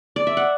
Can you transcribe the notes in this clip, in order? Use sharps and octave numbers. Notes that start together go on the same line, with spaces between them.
D5
E5
F#5